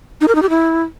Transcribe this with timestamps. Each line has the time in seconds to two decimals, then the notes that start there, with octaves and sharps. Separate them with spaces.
0.21 D#4
0.28 A#4
0.35 D#4
0.42 G4
0.50 E4